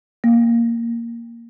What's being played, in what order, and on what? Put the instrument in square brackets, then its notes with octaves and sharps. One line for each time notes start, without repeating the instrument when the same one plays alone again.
[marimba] A#3